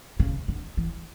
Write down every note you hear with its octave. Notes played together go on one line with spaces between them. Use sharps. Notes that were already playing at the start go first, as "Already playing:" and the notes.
C#3
D3
E3